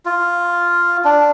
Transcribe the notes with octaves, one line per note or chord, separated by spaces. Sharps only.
F4
D4